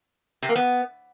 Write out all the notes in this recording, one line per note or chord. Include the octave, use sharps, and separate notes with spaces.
C3
A#3
B3